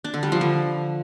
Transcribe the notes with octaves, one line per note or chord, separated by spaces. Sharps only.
D4
D3
G3
F3
D3